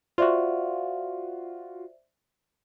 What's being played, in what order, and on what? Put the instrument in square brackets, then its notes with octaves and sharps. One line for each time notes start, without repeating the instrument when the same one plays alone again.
[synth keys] F4 F#4 [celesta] C5 D5 E5